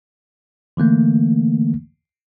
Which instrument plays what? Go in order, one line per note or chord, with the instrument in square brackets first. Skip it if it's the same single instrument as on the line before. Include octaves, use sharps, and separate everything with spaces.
[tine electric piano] D3 E3 A3 A#3